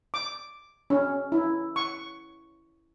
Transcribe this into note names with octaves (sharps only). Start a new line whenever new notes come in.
D6
C#4
E4
C#6